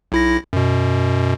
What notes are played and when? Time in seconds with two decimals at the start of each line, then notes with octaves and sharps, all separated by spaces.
0.12 B1 E4 A#6
0.53 F#2 B2